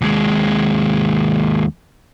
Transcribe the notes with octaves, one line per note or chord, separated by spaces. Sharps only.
D#2 G#3